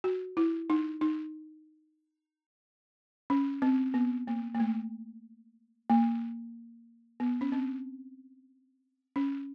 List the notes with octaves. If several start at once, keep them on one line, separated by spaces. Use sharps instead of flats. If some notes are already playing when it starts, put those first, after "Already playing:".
F#4
E4
D#4
D#4
C#4
C4
B3
A#3
A#3
A3
A#3
B3
C#4
C4
C#4